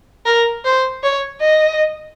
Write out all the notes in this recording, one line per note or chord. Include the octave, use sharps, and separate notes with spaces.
A#4
C5
C#5
D#5